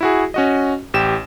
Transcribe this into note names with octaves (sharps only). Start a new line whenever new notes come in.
E4 F#4 G#4
C#4 F#4 D#5
A1 G4 E7